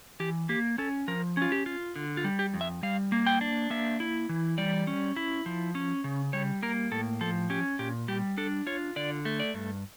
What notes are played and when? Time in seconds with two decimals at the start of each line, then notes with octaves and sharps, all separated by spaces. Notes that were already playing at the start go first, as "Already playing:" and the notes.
0.20 E3 G4
0.49 A#3 G4
0.78 C#4 A4
1.08 F3 A#4
1.37 C#4 F4
1.52 G4
1.66 F4
1.96 D3
2.17 F4
2.24 G3
2.39 G4
2.54 F2
2.61 E5
2.83 G3 F5
3.12 A#3
3.26 G5
3.41 D4
3.70 A#3 E5
4.00 E4
4.29 E3
4.58 G3 D5
4.87 C#4
5.16 E4
5.46 F3
5.75 C#4
6.04 C#3
6.33 G3 C#5
6.63 A#3 A#4
6.91 A2 A4
7.21 F3 A4
7.50 C#4 G4
7.79 A#2 G4
8.08 G3 G4
8.37 D4 A4
8.67 F4 C#5
8.96 D3 D5
9.25 A3
9.40 D5
9.54 G2